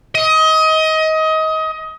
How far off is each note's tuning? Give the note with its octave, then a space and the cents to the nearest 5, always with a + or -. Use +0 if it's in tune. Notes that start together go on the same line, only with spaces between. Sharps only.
D#5 +25